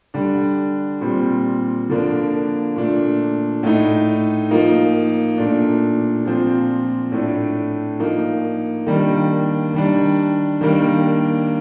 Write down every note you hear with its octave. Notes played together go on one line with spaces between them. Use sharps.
D3 G3 D4
A#2 G3 C4
D3 F3 A#3 D4
A#2 A3 D4
A2 A3 D#4
F3 A#3 D#4
A#2 A3 D4
A#2 F3 C4
A2 A3 D4
F3 A#3 D#4
D#3 G3 A#3 D4
D#3 G3 D4
D#3 G3 A#3 D4